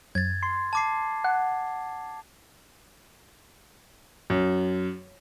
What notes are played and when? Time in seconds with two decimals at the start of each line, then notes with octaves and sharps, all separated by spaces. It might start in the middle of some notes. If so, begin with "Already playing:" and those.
0.15 F#2 G#6 A6
0.43 C6
0.73 A5 D6 C7
1.24 F#5
4.30 F#2